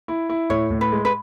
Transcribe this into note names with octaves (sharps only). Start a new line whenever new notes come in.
E4
E4
A2 C#5
A2
B4
G#3
B4